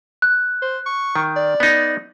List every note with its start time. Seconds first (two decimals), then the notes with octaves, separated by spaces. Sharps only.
0.22 F#6
0.62 C5
0.86 C#6
1.15 D#3
1.36 D5
1.60 B3 D#4